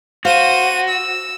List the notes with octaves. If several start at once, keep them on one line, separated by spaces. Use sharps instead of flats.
F#4 C5 F5 D#7
E6